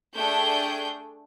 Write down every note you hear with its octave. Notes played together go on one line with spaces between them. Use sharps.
A3 D4 G#4 G5 G6